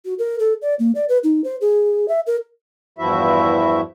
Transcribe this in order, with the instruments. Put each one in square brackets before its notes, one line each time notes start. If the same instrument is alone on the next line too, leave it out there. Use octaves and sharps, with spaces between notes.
[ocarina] F#4
A#4
A4
D5
A#3
D5
B4
D#4
C5
G#4
E5
A#4
[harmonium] E2 G2 F3 E4 F#4 E5